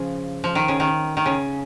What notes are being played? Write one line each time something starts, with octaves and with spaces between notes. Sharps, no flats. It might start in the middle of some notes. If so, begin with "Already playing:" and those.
Already playing: C#3 F3
F3
D#3
C#3
D#3
D#3
C#3